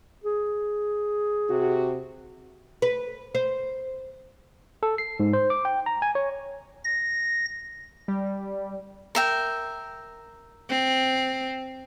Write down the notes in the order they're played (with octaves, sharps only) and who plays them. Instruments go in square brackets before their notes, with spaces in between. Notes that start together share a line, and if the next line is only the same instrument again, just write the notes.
[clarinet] G#4
[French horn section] C3 F#4
[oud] B4
C5
[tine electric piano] A4
C7
G#2
C5
D6
G5
A#5
G#5
C#5
[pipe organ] A#6
[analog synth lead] G3
[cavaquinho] A#4 E5 G5
[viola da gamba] C4